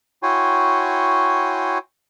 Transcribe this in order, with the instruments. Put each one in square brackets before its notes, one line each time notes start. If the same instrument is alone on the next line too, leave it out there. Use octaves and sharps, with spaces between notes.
[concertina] E4 F#4 C#5 G5 G#5 C6